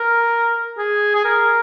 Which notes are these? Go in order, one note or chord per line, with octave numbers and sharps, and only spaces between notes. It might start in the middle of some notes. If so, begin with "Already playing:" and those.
Already playing: A#4
G#4
G#4
A#4